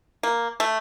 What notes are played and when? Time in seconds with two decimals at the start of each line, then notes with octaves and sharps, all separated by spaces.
0.23 A#3
0.60 A3